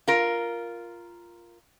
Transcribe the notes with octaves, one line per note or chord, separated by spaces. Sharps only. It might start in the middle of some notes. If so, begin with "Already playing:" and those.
F4 A#4